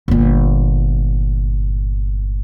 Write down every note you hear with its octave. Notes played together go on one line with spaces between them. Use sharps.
G1 A#2